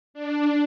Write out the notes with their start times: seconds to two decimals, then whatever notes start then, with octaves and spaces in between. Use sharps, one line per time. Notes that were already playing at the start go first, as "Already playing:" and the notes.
0.14 D4